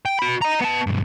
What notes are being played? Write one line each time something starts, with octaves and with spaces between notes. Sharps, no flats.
G5
F#4 B5
D#5 A#5
B3 A5
B1 G2